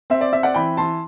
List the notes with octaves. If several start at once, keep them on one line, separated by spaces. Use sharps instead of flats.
C4 E5
D5
C4 E5
D5 F#5
E3 G5 B5
E3 A5 C6